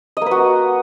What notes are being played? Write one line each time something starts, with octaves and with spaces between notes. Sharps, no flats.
A#3 F#4 B4 D#5